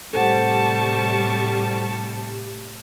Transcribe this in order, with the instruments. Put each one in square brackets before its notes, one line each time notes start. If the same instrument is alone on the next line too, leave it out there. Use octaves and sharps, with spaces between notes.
[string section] A2 C3 G3 [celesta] A4 C5 F#5 [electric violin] A5 C#6